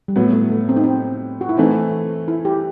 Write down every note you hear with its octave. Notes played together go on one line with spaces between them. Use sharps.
G3
A2 F#3 A3 B3
A3
A3
C4
D#4
C4
F#4
E4
E3 A3 C4 D#4
E4
G4